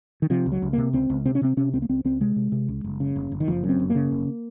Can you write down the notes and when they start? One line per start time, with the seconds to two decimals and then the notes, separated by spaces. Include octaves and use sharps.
0.22 D#3
0.30 C3 F3
0.46 C#2
0.52 F#3
0.62 C#2
0.73 C3 A#3
0.93 C#2 C4
1.10 C#2
1.25 C3 C4
1.35 C#4
1.42 C3 C4
1.57 C3 C#4
1.73 C#2 C4
1.82 A#3
1.89 C#2 C4
2.05 C#2 C4
2.20 C3 G#3
2.36 C3
2.52 C3
2.68 C#2
2.84 F#1
3.00 C#3
3.16 F#1
3.32 F#1
3.40 D#3
3.48 F#1 F3
3.64 F#2
3.69 C4
3.79 F#1
3.90 A#3
3.95 C#3
4.11 F#1